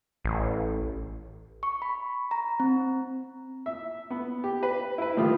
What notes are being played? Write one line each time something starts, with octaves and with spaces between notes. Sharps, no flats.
A1
C#6
B5
A#5
C4
E5
B3
G4
B4
E4 B4
A2 D#3 F3 F4 G4